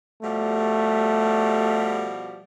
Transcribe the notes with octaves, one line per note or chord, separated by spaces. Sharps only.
B2 F3 G3 A3